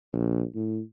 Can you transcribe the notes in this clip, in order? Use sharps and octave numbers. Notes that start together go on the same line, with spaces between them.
A#1
A2